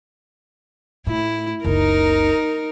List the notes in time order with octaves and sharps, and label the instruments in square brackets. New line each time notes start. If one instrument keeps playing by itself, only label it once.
[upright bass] A2 [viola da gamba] E4
[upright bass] F#1 C#2 [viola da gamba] D#4 A#4